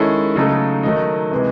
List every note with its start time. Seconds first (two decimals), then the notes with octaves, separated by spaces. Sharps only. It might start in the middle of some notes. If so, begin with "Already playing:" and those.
Already playing: D#3 G#3 C#4 E4 A4
0.36 C#3 F#3 A3 D#4 A4
0.83 D#3 F#3 A3 D#4
1.31 C3 E3 G#3